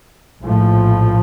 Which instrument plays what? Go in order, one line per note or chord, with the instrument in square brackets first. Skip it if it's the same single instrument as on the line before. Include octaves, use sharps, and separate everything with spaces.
[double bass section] A#1 A2 F3